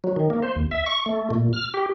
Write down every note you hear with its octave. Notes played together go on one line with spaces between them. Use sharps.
F#3
D#3
A#3
C5
D#2
E5
C#6
A3
A#2
F6
G4